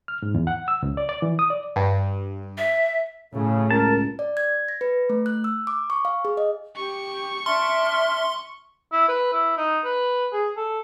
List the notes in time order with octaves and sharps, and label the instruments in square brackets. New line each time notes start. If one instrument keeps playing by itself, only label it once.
[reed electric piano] F6
G#2
E2
F#5
E6
C#2
D5
D5
E3
D#6
D5
[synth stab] G2
[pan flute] E5
[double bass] A2 [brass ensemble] C#3
[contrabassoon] C#2 [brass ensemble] A#4 [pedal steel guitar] A5
[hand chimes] D5
G#6
A#6
B4
A3
F#6
E6
D6
C#6
F5
G#4
D#5
[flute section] G4 [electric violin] C#6
[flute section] D4 A5 F6 [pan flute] E5 [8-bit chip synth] C6
[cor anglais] E4
B4
E4
D#4
B4
G#4
A4